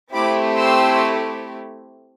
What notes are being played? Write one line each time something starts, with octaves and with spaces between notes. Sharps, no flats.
A3 C4 E4 G4 B5 D6
C6 E6